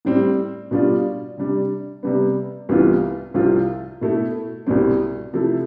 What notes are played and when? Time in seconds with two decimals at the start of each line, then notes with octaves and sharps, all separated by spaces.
0.05 A2 G3 C4
0.71 B2 G3 D4 F4
1.38 C3 G3 D4
2.03 C3 G3 B3
2.69 C2 C3 E3 B3 F4
3.34 C2 C3 F3 C4 F4
4.01 B2 A3 E4
4.66 C2 B2 G3 C4
5.33 C3 F3 A3 E4